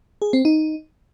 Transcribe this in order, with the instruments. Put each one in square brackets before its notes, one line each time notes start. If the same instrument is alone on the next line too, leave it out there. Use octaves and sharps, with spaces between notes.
[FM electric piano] G#4
C4
D#4